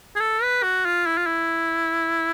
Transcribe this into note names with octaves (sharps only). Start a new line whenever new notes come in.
G#4
A4
B4
F#4
F4
E4
F4
E4